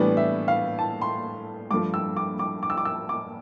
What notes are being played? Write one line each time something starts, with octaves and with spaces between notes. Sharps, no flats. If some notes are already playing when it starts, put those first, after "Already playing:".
Already playing: A2 E3 G3 B3 D4 D5
E5
F5
A5
C6
G2 F3 A3 D6
E6
D6
D6
D6
E6
D6
E6
D6